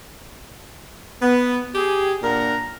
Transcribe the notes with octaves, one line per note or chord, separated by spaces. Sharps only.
B3
G4 G#4
A#2 A#3 D4 A#4 F#5 A#5